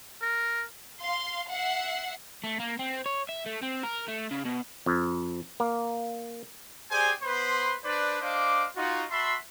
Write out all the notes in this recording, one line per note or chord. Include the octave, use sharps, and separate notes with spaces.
A#4
F5 C6
E5 F#5 C7
A3
A#3
C4
C#5
E5
A3
C4
A#4
A3
C#3
B2
F2
A#3
G4 G#4 C5 D5 G5 G#5
B3 B4 C5 B5 C6
D4 B4 C5 D5
D4 C5 D#5 F5 D6
D#4 F4 F#4
F#4 E5 A5 B5 C6